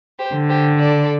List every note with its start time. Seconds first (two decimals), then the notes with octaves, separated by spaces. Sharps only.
0.19 G4 C5
0.34 D3
0.49 G4 C5
0.79 A4 D5